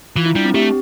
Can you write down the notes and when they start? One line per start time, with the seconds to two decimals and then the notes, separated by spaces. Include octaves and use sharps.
0.16 E3 F4
0.26 E4
0.35 G3 D4
0.45 C4
0.54 A3 G4